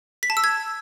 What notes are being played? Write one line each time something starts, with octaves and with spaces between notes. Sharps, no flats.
B6
A5
E6
G#6